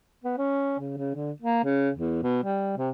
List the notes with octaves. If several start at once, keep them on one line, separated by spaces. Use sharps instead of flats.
B3
C#4
C#3
C#3
D3
A#3
C#3
E2
B2
G3
C3